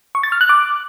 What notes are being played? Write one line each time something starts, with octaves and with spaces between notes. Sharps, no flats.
C#6
A6
F6
F#6
D6